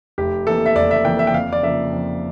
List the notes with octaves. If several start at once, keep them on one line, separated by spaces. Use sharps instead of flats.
F1 G4
F2 E3 A#3 A4
E5
F1 D5
E5
F2 E3 A#3 G5
E5
G5
F2 F5
D5
C#3 F3 A#3 E5
F2